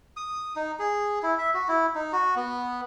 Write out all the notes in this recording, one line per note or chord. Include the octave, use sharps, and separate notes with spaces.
D#6
D#4
G#4
E4
E5
F#4
E4
D#4
F#4
B3